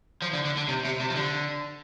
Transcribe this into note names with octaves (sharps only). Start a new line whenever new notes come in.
F3
D3
D3
D3
C3
C3
C3
F3
D3